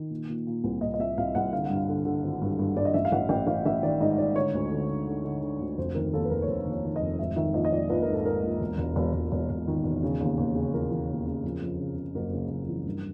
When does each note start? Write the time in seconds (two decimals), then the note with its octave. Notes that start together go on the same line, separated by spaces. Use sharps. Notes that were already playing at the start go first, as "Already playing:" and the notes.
Already playing: D#3
0.10 A#2
0.29 A#2
0.47 A#2
0.64 C2
0.81 C2 D#5
0.94 D#5
0.99 C2 E5
1.18 C2 F5
1.35 C2 F#5
1.53 D3 F5
1.65 G2 F#5
1.76 F5
1.88 D3
2.05 D3
2.24 G#1
2.42 G2
2.59 G2
2.76 G2 D5
2.85 D#5
2.94 A1 E5
3.05 F5
3.12 A1 F#5
3.29 A1 G5
3.47 A1 F5
3.66 A1 E5
3.83 D#3 D5
4.01 G#2 D#5
4.18 G#2 D5
4.36 D3 C#5
4.54 D2
4.71 D3
4.89 D3
5.07 D3
5.24 D3
5.42 D3
5.60 D2
5.78 F1 C5
5.95 D#3 A#4
6.14 D#2 A4
6.25 B4
6.30 F1 A#4
6.42 C#5
6.48 F1 C5
6.65 D#2
6.72 C#5
6.84 D#3
6.96 D#5
7.01 F1
7.19 G#2 E5
7.36 D#3 E5
7.54 A#1 D#5
7.65 D#5
7.72 A#1 D5
7.89 A#1 B4
8.02 A#4
8.08 G#2
8.13 A4
8.25 G#2 A#4
8.43 A#1
8.61 E1
8.78 E1
8.96 E1
9.13 E1
9.32 E1
9.49 E1
9.68 D#3
9.84 E1
10.03 C#3
10.20 D#2
10.38 D#2
10.55 C#3
10.73 E3 A#4
10.91 E3
11.09 D#2
11.26 C#3
11.44 F2
11.62 F2
11.79 C#3
11.97 C#3
12.15 F#1 A#4
12.33 C#3
12.50 F#1
12.69 E3
12.86 G2